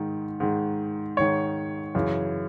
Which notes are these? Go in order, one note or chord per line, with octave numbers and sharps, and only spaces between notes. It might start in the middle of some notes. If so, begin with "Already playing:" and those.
Already playing: G#2 D#3
G#2 D#3
G#2 D#3 C#5
F#2 C#3 E3